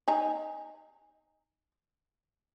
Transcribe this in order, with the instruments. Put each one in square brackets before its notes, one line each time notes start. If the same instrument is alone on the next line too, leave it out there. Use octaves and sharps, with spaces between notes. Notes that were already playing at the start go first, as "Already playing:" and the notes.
[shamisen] D#4 G#5 A#5